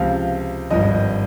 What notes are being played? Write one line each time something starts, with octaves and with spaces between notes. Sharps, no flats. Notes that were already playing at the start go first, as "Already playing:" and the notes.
Already playing: C#2 C3 F3 F5
G#1 G2 F3 D#5